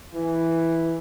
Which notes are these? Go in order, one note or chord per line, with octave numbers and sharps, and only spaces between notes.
E3